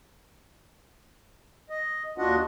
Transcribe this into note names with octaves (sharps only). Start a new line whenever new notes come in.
D#5
D#2 D4 F4 F#4 D#5 F#5